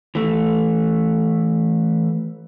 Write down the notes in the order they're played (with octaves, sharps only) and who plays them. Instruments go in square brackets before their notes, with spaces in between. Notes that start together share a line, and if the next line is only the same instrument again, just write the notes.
[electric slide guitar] E3 A3